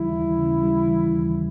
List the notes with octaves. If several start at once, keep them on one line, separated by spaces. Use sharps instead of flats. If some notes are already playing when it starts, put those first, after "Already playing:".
Already playing: D#2 C#3 E3 G3 E4
D#2
C#3
G3
E3
D#2